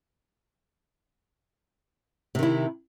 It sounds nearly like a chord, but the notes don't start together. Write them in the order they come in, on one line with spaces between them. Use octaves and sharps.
C3 D#3 E4